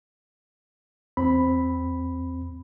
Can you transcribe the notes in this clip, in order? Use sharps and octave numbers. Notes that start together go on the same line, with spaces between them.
E2 C4 B5